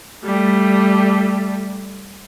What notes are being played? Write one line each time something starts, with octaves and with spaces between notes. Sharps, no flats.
G3 A3